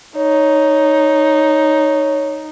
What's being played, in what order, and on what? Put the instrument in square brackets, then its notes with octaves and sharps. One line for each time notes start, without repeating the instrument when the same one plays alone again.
[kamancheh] D#4 [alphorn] C#5